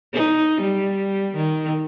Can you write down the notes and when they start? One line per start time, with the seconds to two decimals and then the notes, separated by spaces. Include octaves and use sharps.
0.13 D#4
0.61 G3
1.35 D#3